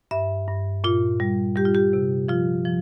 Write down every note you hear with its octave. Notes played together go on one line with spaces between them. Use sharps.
G2 E5
G2
A#2 F4
G3
G3 G4
F4
G4
C3
F3 F4
F3